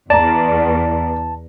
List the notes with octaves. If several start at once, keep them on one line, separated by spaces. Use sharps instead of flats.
E2 D5 A5 A#5